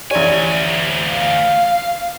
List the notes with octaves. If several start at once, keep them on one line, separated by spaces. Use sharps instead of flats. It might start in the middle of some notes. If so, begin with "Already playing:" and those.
A1 D2 G4 C#5 D5 G#5
F5